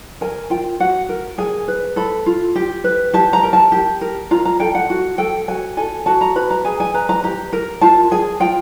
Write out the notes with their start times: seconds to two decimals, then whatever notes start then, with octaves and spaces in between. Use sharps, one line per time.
0.21 A#4 G#5
0.50 F4 G5
0.80 F#4 F#5
1.09 A#4
1.38 G#4 G#5
1.68 B4
1.96 A4 B5
2.26 F4
2.56 G4
2.84 B4
3.14 G4 A5
3.33 A#5
3.43 A#4
3.53 A5
3.72 G4
4.01 A#4
4.31 F4 A#5
4.45 A#5
4.60 A4 G5
4.75 F#5
4.90 F#4
5.18 A4 G5
5.48 F#4 G#5
5.77 A4 G#5
6.06 F#4 A5
6.21 A#5
6.35 B4 B5
6.50 A#5
6.65 G#4 G#5
6.80 G#5
6.94 B4 A#5
7.09 A#5
7.24 G4 A#5
7.53 A#4
7.81 F4 A5
8.11 G#4 G#5
8.40 F4 G5